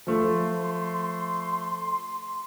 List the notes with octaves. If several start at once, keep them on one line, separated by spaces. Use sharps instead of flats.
F3 A3 C6